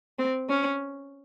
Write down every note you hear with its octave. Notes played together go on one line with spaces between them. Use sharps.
C4
C#4